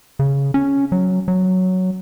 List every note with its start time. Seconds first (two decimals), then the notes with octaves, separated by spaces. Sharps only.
0.19 C#3
0.54 C#4
0.92 F#3
1.28 F#3